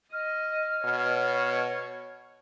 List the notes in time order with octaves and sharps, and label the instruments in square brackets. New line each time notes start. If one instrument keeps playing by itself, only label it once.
[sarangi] D#5 [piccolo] F6
[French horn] B2 [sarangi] C#5